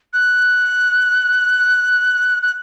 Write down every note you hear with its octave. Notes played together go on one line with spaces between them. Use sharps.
F#6
F#6